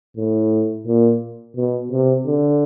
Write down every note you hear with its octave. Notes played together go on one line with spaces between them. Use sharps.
A2
A#2
B2
C3
D3